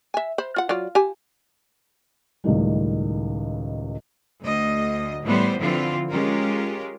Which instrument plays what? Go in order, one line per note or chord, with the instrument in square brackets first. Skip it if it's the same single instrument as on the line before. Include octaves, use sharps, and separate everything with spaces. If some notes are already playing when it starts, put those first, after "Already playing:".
[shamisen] E5 G#5
C5 B5
F4 F#5
F#3 F4 D5
G4 G#5
[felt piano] C#2 A2 D#3 G3
[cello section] D2 D#5
A2 E3 G3 B3 C5
D3 E3 F3 C4 F4
G#3 C#4 F4 G4 A#4